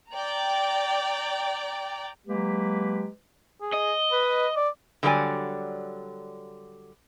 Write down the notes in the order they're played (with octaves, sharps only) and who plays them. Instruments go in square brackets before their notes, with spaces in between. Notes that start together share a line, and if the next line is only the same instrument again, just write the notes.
[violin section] D5 G5 A#5
[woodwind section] F#3 G#3 A#3 G4 B4
[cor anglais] G#4
[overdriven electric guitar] D#5
[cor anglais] B4
D5
[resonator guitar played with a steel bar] D3 F#3 G3 G#4 D5 G#5